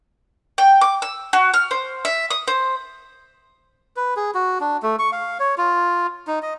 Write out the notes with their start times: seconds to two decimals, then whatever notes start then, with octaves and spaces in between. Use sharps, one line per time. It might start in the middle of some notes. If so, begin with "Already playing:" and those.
0.58 G5
0.81 D6
1.02 E6
1.33 F#4
1.54 F6
1.71 C5
2.05 E5
2.31 D#6
2.48 C5
3.97 B4
4.16 G#4
4.35 F#4
4.60 D4
4.83 A3
4.99 C#6
5.12 F5
5.40 C#5
5.58 F4
6.27 D#4
6.43 D#5